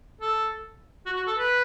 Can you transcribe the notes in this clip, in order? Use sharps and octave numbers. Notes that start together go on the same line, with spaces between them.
A4
F#4
F#4
A4
B4